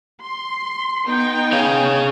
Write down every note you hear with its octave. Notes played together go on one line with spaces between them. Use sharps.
C6
B3 D#4 G5
G#4 C#5 F5